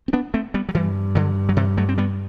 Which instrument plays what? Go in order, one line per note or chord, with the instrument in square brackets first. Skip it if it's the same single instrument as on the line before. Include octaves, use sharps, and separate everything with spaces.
[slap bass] C4
B3 D4
A3 C4
G3 B3
F#3
[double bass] G2 [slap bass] E3 G3
[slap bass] D3 F#3
F#3
C3 E3
F#3 A3
C4
G3 B3